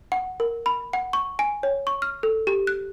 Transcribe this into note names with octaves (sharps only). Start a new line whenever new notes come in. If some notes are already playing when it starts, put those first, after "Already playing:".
F#5
A#4
B5
F#5
C#6
G#5
C#5
C#6
F6
A4
G4
F#6